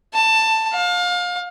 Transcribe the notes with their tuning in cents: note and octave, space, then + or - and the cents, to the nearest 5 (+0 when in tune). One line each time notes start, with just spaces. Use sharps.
A5 +15
F5 +30